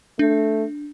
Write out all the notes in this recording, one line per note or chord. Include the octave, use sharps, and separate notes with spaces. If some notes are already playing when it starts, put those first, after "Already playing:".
A3 D4